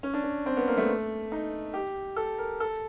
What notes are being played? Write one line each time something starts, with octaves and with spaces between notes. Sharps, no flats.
C#4
D4
C#4
C4
B3
A#3
A3
D#4
G4
A4
A#4
A4